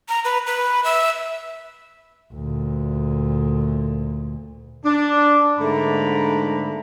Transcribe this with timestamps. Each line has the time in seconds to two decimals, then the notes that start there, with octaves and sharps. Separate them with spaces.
0.09 A#5
0.25 B4
0.47 B4
0.84 E5
2.33 D2 A#2
4.85 D4
5.60 G#2 D3 A3 A#3 A#5 B5